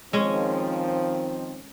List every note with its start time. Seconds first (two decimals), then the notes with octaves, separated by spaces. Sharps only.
0.13 D#3 F3 G#3 C4 C#4